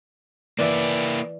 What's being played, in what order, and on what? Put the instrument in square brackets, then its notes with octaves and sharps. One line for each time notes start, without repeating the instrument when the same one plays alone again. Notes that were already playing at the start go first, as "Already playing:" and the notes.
[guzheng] E3 D5 [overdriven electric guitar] A#3 E4